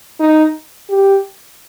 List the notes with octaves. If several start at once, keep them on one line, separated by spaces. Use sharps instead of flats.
D#4
G4